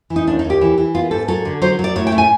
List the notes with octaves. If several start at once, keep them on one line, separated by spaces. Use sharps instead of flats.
E3
D#4
D#2 D4
D#4
D#2
G4
E3
E3
B3 F4
G#2 A4
F#3 A4
D3
F#3 C5
F#3
D5
A2 C#5
G5
A3
G#5